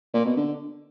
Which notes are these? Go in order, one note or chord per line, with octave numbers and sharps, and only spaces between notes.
A#2
B2
D3